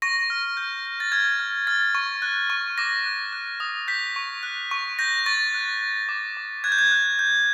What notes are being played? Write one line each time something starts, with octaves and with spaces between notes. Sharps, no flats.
C#6 A#6
F6
G6
G6
A6
F6 G#6
F6
F6 A6
C#6
F#6
C#6
D6 A#6
F#6
F#6
D#6
G6 B6
C#6
F#6
C#6
G6 A#6
C#6 A6
F#6
F#6
D6
D6
F#6 G#6
G6
G#6
F#6
G6